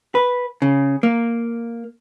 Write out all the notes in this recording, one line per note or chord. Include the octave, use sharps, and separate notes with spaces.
B4
C#3
A#3